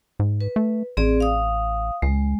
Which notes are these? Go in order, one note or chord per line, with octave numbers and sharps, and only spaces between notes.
G#2
B4
A3
A1 C4 G#4 D5
F5 D#6
C#2 G#3